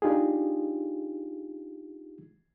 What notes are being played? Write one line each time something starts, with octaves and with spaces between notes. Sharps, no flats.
D4 D#4 F4 G4 G#4